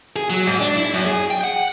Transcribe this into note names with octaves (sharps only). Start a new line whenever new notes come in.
G#4
F#3
G#2
D4
E4
F#2
G#4
G5
F#5